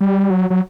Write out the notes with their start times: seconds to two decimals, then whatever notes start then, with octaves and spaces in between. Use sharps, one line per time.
0.01 G3
0.30 F#3
0.50 F#3